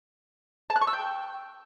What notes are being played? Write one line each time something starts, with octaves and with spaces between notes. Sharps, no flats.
A5
F#6
C#6
E6
G5